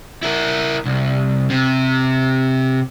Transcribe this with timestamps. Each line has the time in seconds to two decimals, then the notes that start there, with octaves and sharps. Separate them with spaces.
0.23 E4 A#4
0.85 C2
1.50 C3